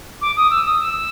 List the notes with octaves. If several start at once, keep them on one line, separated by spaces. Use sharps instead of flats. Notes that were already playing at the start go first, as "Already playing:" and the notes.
D6
D#6
E6
D#6
E6